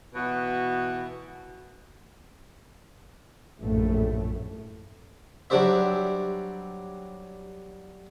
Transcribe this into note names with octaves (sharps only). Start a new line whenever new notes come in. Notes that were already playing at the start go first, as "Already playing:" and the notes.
B2 E3 B3 F#4
A#1 F#2 A2 A3
F#3 G3 D4 G4 C5 E5